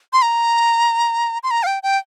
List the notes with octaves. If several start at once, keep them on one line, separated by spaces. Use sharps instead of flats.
C6
A#5
C6
A#5
F5
G5
G5